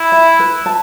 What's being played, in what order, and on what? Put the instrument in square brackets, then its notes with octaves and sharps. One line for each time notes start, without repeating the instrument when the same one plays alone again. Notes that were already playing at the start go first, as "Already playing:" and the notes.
Already playing: [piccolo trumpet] E4
[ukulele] E5
B4
A5